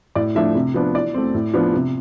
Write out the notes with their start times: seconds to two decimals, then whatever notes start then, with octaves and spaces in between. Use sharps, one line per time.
0.15 A2 D5
0.35 F3 A3 D4 E5
0.55 C3
0.74 F3 B3 D4
0.94 E3 D5
1.14 A3 C4
1.34 A2
1.54 F3 B3 D4
1.73 C3